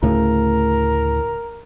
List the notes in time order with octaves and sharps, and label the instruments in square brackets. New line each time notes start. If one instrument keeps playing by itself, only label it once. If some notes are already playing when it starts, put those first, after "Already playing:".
[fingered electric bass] D2 A2 C#3 [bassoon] A#4